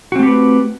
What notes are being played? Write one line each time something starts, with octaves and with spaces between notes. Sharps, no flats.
A3 C4 F#4 G4 B4